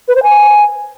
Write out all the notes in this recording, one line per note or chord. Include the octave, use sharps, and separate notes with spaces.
B4
C5
G#5